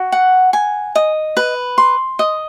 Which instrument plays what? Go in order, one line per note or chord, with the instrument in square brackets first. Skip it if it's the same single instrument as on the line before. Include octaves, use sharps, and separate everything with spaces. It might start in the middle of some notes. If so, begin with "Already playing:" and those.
Already playing: [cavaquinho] F#4
F#5
G#5
D#5
B4
C6
D#5